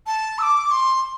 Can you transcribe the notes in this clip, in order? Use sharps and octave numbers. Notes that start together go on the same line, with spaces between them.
A5
E6
D6
C6